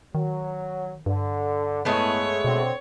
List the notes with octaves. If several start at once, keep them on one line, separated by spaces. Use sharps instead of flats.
D#3 F#3
G2 D3
A2 G#3 A3 B3 C#5
B2 D3 C4